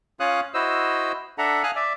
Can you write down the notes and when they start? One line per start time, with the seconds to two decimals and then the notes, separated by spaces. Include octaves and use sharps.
0.20 C#4 F4 C#5 F5 D#6 F#6
0.54 E4 F#4 C5 D#5 E6
1.38 D4 A4 E5 F#5 A#5
1.64 F5 G#5 D#6 F6 F#6
1.76 D5 E5